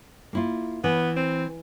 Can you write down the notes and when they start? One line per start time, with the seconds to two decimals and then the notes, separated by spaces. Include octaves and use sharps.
0.33 A#3 E4 F4
0.84 E3 B3
1.16 C4